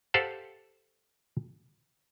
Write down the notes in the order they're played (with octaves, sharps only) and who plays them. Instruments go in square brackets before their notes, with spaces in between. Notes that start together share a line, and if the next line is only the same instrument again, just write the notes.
[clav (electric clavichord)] G4 A4 C5 F5 F#5